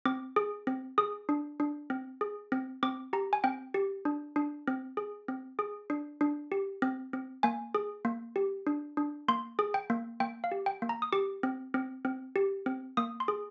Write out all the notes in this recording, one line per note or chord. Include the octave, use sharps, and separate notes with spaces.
C4 D6
G#4
C4
G#4 D#6
D4
D4
C4
G#4
C4
C4 D6
G4 A#5
G#5
C4 G5
G4
D4
D4
C4
G#4
C4
G#4
D4
D4
G4
C4
C4
A#3 G#5
G#4
A#3
G4
D4
D4
A#3 C6
G#4
G5
A#3
A#3 G5
F5
G4
G5
A#3
A#5
D#6
G4 D6
C4
C4
C4
G4
C4
A#3 D#6
C6
G#4